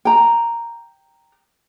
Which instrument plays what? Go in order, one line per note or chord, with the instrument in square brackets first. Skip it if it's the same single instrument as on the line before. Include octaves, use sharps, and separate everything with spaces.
[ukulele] G5 A#5